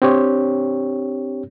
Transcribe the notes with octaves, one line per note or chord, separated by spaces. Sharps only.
C4 D4 G4 C#5